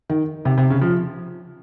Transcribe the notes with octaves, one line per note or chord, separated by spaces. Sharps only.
D#3
C3
C3
C#3
F3